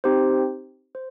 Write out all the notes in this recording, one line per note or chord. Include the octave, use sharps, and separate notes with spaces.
C4 D#4 G4 C5
C5